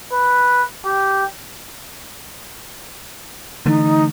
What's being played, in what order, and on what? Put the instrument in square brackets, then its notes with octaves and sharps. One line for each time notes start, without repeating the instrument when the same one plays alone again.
[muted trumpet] B4
G4
[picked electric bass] D3 E3 A3 [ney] D#4